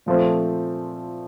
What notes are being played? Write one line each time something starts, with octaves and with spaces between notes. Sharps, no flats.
A#2 F3 A3 C4